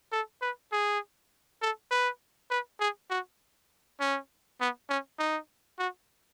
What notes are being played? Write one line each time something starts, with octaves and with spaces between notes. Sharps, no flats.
A4
B4
G#4
A4
B4
B4
G#4
F#4
C#4
B3
C#4
D#4
F#4